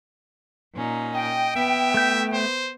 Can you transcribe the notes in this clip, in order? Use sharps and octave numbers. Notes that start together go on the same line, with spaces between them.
A#2 C#4 D#4
D#5 G5
B3 E5
A3 G6
C5